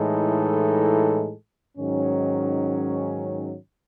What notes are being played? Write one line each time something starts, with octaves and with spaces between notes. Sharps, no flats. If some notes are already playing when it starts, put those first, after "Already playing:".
Already playing: A2 E3 G#3 D#4 A4
G#2 D#3 F#3 C#4